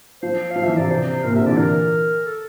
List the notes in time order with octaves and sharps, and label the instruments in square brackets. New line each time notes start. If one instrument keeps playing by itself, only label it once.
[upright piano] F3 [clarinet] C5
[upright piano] F3 [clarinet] F5
[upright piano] E3 F3 [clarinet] E5
[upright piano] C3 [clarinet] D5
[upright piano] C3 [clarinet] C5
[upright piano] A#2 [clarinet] A#4
[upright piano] C3 [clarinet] E5
[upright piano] D3
[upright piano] E3 [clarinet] D5
[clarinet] A#4
A4